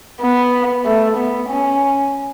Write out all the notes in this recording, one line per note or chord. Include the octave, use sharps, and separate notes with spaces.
B3
A3
B3
C#4